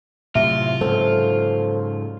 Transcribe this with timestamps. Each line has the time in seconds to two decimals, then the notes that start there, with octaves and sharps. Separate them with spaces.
0.35 A2 C3 F#3 F4 E5
0.81 G#2 C#3 F#3 A4 C5